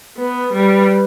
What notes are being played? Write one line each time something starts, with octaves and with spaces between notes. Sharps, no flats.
B3 B4
G3